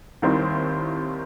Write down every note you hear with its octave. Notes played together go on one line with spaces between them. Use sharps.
D#2 D#3 G3 C4 E4